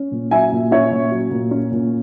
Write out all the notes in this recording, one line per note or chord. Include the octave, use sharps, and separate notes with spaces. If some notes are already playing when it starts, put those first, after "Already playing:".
Already playing: C#4
A#2
F#3 E5 G#5
A#2
C#4 C#5 E5
A#2
F#3
A#2
C#4
A#2